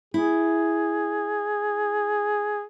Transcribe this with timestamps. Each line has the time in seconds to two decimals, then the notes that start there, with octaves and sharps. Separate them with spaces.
0.14 E4 G#4